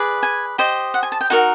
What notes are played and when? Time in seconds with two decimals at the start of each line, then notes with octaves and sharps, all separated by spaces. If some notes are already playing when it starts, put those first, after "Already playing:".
Already playing: G#4 B4 D5
0.23 G#5
0.58 G4 C5 D#5
0.94 F#5
1.03 G#5
1.12 A5
1.21 G5
1.30 D#4 F#4 A#4 F#5